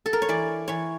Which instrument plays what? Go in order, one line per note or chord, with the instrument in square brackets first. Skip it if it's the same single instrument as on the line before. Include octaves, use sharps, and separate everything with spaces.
[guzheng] A4
A#4
C#5
E3 D5
E3 C#5